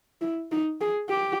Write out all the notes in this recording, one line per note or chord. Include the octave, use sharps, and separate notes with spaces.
E4
D#4
G#4
G4